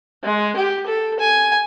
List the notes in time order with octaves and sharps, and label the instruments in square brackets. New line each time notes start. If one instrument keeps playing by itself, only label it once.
[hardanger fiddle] G#3
G4
A4
G#5